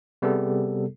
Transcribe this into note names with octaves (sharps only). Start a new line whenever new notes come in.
C3 G3 B3 G#4 A4